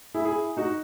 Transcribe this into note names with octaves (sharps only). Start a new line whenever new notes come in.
E4 G#4
E4 G#4
D#4 F#4